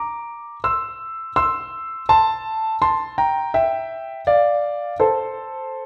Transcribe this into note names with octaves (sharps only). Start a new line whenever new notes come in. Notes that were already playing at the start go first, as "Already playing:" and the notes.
Already playing: A#5 D6
C6 E6
C6 E6
A5 C6
A5 C6
G5 A#5
E5 G5
D5 F5
A4 C5